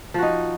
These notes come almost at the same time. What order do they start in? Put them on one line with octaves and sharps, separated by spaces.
F3 F#4 D#4